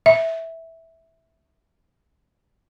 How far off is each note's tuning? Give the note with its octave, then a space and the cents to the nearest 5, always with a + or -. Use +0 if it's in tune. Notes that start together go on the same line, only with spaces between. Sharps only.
E5 -10